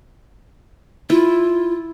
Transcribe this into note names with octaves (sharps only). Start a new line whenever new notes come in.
E4 F4